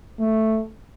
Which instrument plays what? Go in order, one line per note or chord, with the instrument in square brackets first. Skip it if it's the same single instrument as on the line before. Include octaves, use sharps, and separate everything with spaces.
[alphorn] A3